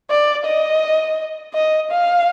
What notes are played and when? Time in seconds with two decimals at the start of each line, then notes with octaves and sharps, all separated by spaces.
0.10 D5
0.45 D#5
1.54 D#5
1.91 F5